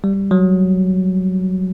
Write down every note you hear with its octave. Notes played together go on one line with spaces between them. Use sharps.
G3
F#3